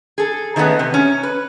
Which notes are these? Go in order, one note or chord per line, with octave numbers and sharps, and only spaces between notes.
G#4 A4
D#3 E3 G#3 A3 B3 C#4
C3
C#4
B4